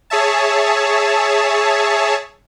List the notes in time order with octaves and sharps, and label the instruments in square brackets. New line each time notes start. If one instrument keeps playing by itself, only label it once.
[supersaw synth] G#4 C#5 E5 A5